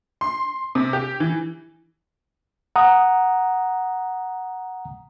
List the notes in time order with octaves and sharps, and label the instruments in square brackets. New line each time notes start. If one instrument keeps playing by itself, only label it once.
[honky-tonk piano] C6
C3
G4
E3
[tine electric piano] F#5 A#5 D#6